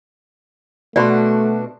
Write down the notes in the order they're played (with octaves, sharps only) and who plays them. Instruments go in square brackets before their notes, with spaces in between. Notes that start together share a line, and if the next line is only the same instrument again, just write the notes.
[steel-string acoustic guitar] B2 D4 F#4 [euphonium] A3 [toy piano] D5 B5 C6